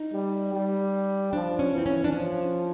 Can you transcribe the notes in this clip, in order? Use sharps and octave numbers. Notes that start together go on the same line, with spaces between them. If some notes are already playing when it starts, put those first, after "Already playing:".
Already playing: D#4
G3
G3
F3 D4
C#4
E3
C4
C#4
D4
F3 C#4